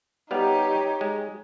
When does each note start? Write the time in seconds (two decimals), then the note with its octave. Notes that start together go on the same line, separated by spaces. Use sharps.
0.31 G3 B3 D#4 G4 C#5 F5
1.01 G#3